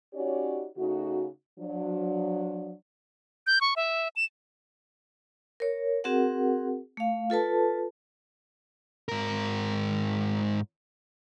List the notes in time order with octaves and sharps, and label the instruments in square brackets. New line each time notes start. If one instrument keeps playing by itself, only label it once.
[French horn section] C#4 D#4 F#4 G4 C#5 D5
C#3 A3 D#4 F#4
F3 F#3 D4
[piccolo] G6
C#6
E5
E7
[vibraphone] A#4 C#5
C4 F#4 G#4 A#4 F#5
A3 F5
F4 A4 B4 A5
[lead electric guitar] G#2 A#4